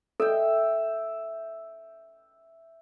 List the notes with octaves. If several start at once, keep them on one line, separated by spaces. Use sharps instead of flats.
A4 E5 G5